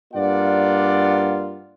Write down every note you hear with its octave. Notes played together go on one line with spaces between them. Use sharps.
G2 A#3 F4 D5 F#5